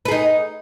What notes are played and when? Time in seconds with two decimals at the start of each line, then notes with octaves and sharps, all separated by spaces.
0.05 B4
0.08 G#4
0.11 D#4